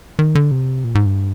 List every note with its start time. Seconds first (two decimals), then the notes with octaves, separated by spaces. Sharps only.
0.19 D#3
0.35 D3
0.51 C3
0.84 A#2
0.95 G#2
1.06 G2